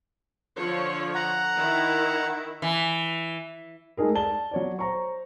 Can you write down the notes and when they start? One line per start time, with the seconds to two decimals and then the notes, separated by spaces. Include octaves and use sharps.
0.57 D3 F3 C#5
1.15 F#5 A#5
1.57 D#3 E4
2.62 E3
3.97 G#3 A3 D#4 G#4 A#4
4.15 D5 A5 G7
4.51 F#3 C#5 D5
4.79 C5 A#5 C#6